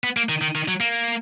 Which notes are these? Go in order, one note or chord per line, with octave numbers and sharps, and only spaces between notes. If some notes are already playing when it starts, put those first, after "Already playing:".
B3
A#3
D#3
D#3
D#3
F#3
A#3